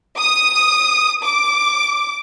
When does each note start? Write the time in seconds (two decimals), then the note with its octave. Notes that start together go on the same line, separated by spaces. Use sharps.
0.18 D#6
1.22 D6